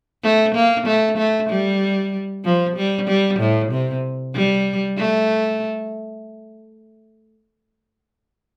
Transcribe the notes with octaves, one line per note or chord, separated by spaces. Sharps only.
A3
A#3
A3
A3
G3
F3
G3
G3
A2
C3
G3
A3